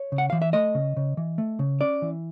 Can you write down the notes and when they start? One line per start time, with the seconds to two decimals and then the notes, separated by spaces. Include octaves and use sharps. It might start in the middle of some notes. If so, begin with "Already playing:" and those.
Already playing: C#5
0.12 C#3
0.18 F#5
0.30 E3 F5
0.42 E5
0.53 A3 D#5
0.75 C#3
0.97 C#3
1.17 E3
1.38 A3
1.59 C#3
1.81 C#4 D5
2.02 E3